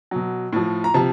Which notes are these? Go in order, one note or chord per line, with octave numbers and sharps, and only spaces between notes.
B2 F#3
A2 F3
A#5
C3 F3 A5